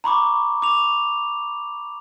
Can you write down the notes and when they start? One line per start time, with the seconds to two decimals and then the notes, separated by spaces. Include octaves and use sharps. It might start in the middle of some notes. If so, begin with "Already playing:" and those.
0.04 A#5 B5 C#6 D6
0.62 D6 F7